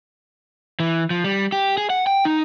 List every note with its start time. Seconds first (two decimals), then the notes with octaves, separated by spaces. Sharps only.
0.80 E3
1.10 F3
1.24 G3
1.52 G4
1.78 G#4
1.90 F#5
2.07 G5
2.25 D#4